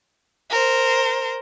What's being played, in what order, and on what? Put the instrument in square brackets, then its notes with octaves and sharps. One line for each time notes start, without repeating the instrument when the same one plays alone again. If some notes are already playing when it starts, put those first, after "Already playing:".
[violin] A#4 C5